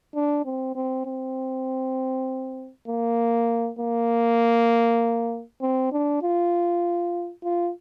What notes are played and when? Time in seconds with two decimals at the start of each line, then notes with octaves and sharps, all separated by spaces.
0.15 D4
0.45 C4
0.76 C4
1.06 C4
2.88 A#3
3.79 A#3
5.61 C4
5.92 D4
6.22 F4
7.43 F4